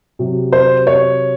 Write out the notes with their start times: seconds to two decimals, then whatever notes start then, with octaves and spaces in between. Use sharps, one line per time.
0.19 C3 F#3
0.52 C5
0.87 C#5